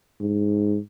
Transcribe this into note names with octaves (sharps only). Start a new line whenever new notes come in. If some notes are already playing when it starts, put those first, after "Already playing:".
G#2